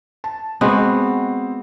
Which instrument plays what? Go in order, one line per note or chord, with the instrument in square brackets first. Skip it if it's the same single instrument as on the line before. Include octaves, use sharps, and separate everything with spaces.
[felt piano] A5
[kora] G#3 B3 F#4 [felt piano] C4